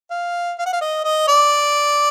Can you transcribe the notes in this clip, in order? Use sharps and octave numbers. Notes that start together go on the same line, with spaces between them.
F5
F5
F#5
F5
D#5
D#5
D5